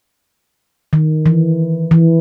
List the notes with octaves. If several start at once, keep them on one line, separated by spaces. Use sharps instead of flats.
D#3
E3
E3